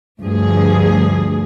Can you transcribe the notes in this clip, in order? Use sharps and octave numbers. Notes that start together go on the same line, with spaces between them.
D2 G2 F3 G#4